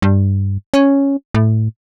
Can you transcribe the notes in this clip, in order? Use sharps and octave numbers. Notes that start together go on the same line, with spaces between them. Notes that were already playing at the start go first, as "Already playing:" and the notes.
G2
C#4
A2